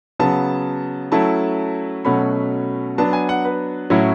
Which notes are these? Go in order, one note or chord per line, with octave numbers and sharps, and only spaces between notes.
C#3 F#3 B3 A5
F#3 A3 C#4 E4 A5
B2 F#3 A3 C#4 B5
F#3 B3 D4 A5
G#5
F#5
B4
A2 F#3 A3 C#4 E4